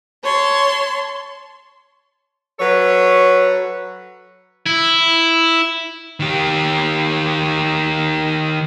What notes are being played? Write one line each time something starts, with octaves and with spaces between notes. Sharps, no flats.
C#5 A5 C6
F#3 A4 B4 C#5
E4
D#3 G4